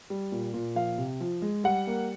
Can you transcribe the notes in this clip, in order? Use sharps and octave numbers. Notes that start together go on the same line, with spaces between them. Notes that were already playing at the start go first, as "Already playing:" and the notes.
G3
A#2
A#2
F3 F5
C3
F3
G#3
G3 F#5
A#3